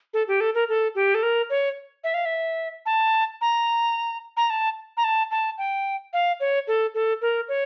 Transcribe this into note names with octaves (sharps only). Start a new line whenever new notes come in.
A4
G4
A4
A#4
A4
G4
A4
A#4
C#5
E5
F5
E5
A5
A#5
A#5
A5
A#5
A5
A5
G5
F5
C#5
A4
A4
A#4
C#5